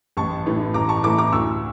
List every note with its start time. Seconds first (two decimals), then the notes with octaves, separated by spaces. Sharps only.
0.17 A1 A5 C#6
0.46 A2 E3 A3
0.74 A1 A#5 D6
0.89 A5 C#6
1.03 A2 E3 A3 A#5 D6
1.18 A#5 D6
1.32 D2 C#6 E6